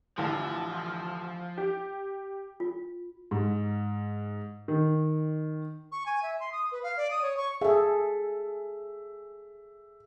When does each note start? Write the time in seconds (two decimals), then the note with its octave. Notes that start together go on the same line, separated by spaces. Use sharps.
0.18 A1 D3 E3 F3
1.57 G4
2.60 F4
3.31 G#2
4.68 D#3
5.92 C#6
6.06 G#5
6.23 E5
6.40 C6
6.52 D#6
6.72 B4
6.83 F5
6.97 D5
7.11 D#6
7.22 C#5
7.37 C#6
7.61 G#4 A4 E5